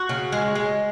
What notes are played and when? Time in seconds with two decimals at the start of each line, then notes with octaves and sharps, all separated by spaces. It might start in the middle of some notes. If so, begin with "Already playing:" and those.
Already playing: F#4
0.09 C#3
0.32 G#3
0.55 G#3